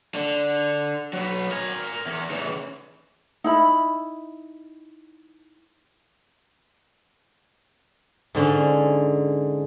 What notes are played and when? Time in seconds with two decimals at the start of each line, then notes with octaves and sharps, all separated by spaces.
0.15 D3
1.13 F#3 B3
1.51 A#4 G#5
2.06 E2
2.30 C#3 E3
3.44 D#4 E4 B5
8.35 G#2 D3 C#4